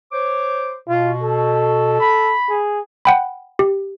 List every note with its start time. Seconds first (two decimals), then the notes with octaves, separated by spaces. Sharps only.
0.12 C5 C#5 D6
0.89 B2 F4
1.23 A4
1.99 B5
2.49 G#4
3.05 F#5 G5 B5
3.59 G4